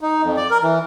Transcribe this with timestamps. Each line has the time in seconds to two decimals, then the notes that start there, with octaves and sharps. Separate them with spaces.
0.01 D#4
0.23 F2
0.36 D5
0.50 A#4
0.62 E3